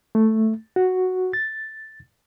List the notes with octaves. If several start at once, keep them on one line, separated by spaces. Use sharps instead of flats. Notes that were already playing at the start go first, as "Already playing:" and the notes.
A3
F#4
A6